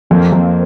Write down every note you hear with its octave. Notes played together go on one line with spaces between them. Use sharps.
F2 A#3 C4
F2